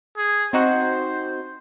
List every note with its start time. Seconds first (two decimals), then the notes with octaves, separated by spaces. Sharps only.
0.17 G#4
0.53 C4 D#4 F#4 C5